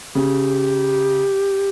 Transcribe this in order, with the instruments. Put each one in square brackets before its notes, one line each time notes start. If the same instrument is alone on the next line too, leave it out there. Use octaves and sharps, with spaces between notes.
[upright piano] C#3 [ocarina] G4